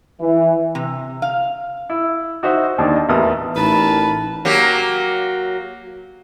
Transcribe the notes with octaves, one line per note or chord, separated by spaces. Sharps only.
E3
C3
F5
E4
D#4 F#4 C5 D#5 E5
D#2 D4 D#4
D#5
A1 E2 A#4 D#6
A1 D#4 A#4 B4 A5 B5
F#3 A#3 G4